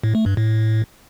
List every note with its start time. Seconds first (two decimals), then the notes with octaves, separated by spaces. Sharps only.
0.04 A2
0.15 A3
0.26 G2
0.37 A2